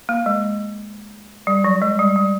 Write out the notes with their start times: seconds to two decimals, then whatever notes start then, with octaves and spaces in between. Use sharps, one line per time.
0.09 A#3
0.26 G#3
1.47 G3
1.64 F#3
1.82 G#3
1.99 G3
2.16 G3